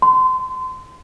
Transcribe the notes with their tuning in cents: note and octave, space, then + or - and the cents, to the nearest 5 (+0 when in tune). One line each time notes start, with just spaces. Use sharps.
C6 -30